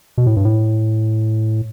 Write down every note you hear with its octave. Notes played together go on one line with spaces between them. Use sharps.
B2
A2
G2
A2